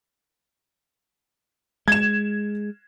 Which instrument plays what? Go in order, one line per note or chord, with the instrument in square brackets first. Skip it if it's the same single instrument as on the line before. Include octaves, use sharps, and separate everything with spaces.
[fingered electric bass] G#3 [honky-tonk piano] G#6 E7